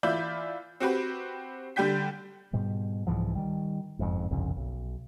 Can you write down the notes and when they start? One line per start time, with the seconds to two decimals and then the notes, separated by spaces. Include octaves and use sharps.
0.03 E3 F4 D5 E5 B5 G6
0.80 C4 F#4 G4 B4
1.76 D3 G3 G4 G5 G6 B6
2.53 G#2 B2 G3
3.07 C2 G#2 E3 F3
3.35 D#3 G3
3.99 F#1 F2 G#2
4.31 G1 C2 F2 C#3
4.57 B1